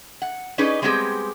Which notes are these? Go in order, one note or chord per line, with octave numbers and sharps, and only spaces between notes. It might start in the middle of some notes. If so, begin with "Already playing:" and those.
F#5
C#4 D#4 G#4 B4 D5 D#5
G3 G#3 B3 C4 G4 G#4